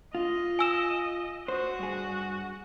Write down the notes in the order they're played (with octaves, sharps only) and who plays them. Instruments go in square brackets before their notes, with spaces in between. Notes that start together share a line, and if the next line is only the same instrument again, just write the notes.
[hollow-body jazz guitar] F4 [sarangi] D#5
[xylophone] G#5 E6 E7
[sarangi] F#4 [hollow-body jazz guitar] C5
[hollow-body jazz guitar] G2 G#4